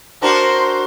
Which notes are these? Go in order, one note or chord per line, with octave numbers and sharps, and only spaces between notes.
D4 F#4 A#4 C5